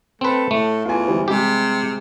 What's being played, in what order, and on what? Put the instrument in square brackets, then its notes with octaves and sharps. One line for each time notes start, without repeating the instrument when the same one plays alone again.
[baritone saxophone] A3 [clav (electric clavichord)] C4 B4
[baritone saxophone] A2 [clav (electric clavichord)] A3
[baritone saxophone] E2 [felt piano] F4 G#5
[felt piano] E3 G3 C5
[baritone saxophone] C3 [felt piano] G3 G#3 G#4 [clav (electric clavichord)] G4